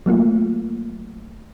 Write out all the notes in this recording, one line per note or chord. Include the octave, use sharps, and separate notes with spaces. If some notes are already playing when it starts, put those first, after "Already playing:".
F#3 A3 A#3 F4